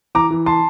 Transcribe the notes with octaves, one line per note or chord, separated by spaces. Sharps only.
E3 A#5 D6
E3
A5 C6